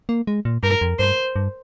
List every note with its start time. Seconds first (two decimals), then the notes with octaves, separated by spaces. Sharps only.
0.09 A#3
0.27 G#3
0.45 A#2
0.63 G2 A#4
0.81 F2
0.99 G2 C5
1.36 G2